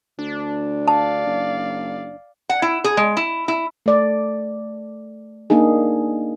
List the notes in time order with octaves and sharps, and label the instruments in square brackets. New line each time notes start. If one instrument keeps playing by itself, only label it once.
[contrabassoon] D2 [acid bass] D4
[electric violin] D5 F5 [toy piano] A5
[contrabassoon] F#1
[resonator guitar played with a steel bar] F#5
E4
G#4
G#3
E4
E4
[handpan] A3 D5
A#3 D4 D#4 G#4